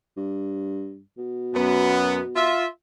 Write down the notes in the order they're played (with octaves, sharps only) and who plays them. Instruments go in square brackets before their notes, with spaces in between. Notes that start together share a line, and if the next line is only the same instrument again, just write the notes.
[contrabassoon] G2
B2
[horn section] F#2 B3
F4 E5